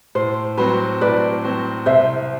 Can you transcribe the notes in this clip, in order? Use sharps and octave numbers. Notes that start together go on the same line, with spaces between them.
A2 C5
F#3 C4 F#4 B4 C5
A2 B4 D5
F#3 C4 F#4 C5
C2 C5 E5